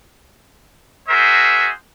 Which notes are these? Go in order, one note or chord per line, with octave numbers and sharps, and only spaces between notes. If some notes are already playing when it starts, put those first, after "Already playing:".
F#4 G#4 A#4 C5 E5